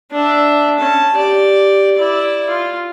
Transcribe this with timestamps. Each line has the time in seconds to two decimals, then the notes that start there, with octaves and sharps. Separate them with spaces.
0.12 D4 E5
0.78 C#4 A5
1.16 G4 D5
1.96 E4 D5
2.49 F4